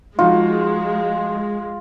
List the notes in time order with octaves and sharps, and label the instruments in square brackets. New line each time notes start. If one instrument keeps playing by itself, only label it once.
[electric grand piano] F3 D#4 F#4 [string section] G#3 [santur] F4